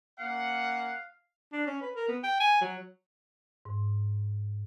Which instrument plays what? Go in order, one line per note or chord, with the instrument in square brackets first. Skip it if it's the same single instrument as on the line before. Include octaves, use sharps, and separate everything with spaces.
[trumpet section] A#3 C#4 F#5 [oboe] F5
[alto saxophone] D4
C#4
B4
A#4
B3
G5
G#5
F#3
[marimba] G#2